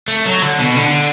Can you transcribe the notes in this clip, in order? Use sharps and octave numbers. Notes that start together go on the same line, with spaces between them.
A3
F#3
D3
B2
D3